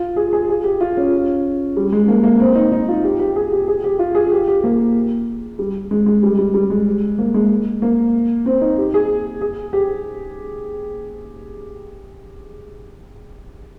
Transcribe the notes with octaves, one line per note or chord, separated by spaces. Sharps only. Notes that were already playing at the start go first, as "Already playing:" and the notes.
Already playing: F4
G#4
G#4
G#4
G4
F4
C#4
G3
G#3
A#3
A#3
C4
D#4
D#4
F4
G4
G4
G#4
G4
G#4
G4
F4
G#4
G4
G4
A#3
G3
G#3
G#3
G3
G3
G3
G#3
A#3
G#3
A#3
C4
D#4
G4
G#4
G#4
G4